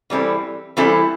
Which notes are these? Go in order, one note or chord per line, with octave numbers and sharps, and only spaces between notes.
E3 G3 C4 E4 A4
E3 G3 C4 E4 A4